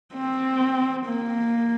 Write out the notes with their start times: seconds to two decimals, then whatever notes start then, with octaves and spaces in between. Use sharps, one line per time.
0.15 C4
1.06 A#3